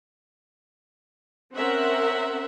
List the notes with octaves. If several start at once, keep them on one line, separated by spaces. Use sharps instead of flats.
C4 C#4 A#4 C5 E5 F#5